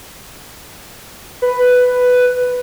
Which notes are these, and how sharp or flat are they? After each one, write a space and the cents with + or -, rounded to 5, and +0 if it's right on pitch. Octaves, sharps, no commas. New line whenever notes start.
B4 +5